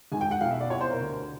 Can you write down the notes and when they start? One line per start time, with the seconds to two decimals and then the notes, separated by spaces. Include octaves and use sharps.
0.12 G#1 G#2 D#3 G#5
0.21 G5
0.31 F#5
0.41 B1 B2 F5
0.51 E5
0.61 D5
0.70 C2 B2 C#5
0.81 C5
0.91 A#4
1.00 D2 D3